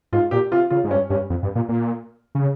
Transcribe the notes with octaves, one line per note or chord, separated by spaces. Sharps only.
G#2 F4
A#2 G4
C3 F4
C#3 F4
G#2
G2 C#4
G2 C#4
F2
G2
A#2
A#2
C#3